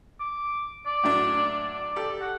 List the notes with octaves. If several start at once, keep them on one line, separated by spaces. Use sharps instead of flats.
D6
D5
A2 F#3 D4
D5
G4 A4
F#5